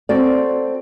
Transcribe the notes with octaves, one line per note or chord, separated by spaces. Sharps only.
C4 F#4 A4 D5